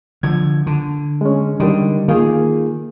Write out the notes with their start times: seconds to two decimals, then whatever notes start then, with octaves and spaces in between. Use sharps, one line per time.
0.23 D3 F3 G#6
0.67 D3
1.21 G#3 C#4
1.60 D3 D#3 G3 D#4
2.08 D#3 A#3 F4 G#4